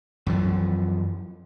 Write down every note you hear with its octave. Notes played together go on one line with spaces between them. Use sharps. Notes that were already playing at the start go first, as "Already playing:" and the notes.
F#2 E3 F3